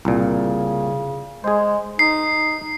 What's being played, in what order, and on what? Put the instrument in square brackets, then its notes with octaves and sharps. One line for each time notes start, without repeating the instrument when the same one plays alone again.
[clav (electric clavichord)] C2 A#2 [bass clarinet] C#3
[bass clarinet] G#3 [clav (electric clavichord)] G#4 C5
[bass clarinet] D#4 [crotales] C7